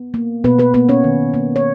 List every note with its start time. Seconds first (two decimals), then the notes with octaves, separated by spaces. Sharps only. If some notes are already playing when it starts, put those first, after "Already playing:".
Already playing: B3
0.14 A#3
0.44 B2 B3 B4
0.59 B3 B4
0.74 A#3 B3 B4
0.89 C#4 C#5
1.04 D#3
1.34 A#3
1.56 C#5